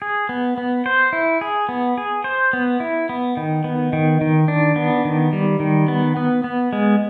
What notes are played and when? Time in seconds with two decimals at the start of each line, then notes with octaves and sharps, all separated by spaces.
0.02 G#4
0.29 B3
0.58 B3
0.86 C5
1.13 E4
1.41 G#4
1.69 B3
1.98 G#4
2.24 C5
2.53 B3
2.80 E4
3.09 B3
3.37 D#3
3.64 B3
3.93 D#3
4.21 D#3
4.48 D4
4.76 B3
5.05 D#3
5.33 G3
5.60 D#3
5.88 B3
6.17 B3
6.44 B3
6.73 G#3